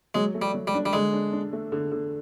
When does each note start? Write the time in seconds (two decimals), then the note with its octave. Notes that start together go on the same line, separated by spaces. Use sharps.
0.15 F#3 G#3
0.34 A3
0.42 G3
0.54 F#3
0.67 G3
0.74 D4
0.86 G3
0.93 D3 G#3
1.13 D4
1.33 D4
1.53 A3
1.72 D3
1.92 D3